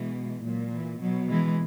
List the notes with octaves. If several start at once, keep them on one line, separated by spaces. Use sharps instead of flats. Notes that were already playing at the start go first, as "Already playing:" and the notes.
Already playing: B2 E3 G#3
A#2 F#3
E3
B2 F#3
E3 G#3